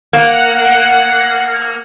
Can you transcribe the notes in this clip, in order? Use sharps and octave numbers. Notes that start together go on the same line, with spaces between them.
A#3 F#5